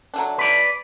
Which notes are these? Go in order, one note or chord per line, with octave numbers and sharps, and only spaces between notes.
F#3 A3 D4
B4 D5